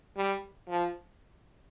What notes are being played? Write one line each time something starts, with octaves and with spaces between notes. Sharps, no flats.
G3
F3